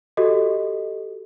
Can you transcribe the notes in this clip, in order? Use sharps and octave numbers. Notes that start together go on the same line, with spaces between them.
F#4 G4 A4 D#5